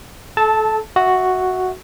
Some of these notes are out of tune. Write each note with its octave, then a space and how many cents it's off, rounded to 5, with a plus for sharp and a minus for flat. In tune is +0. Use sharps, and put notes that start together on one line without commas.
A4 -25 A5 +0
F#4 +0 E5 -20